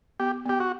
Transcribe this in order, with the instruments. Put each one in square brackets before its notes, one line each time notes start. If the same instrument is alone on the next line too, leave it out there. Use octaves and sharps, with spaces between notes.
[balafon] B3 [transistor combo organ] G4
[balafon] B3 [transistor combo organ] G4
[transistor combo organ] F#4